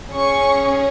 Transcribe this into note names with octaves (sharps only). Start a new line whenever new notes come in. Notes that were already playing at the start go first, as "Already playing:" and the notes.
C#4 G#4 C#6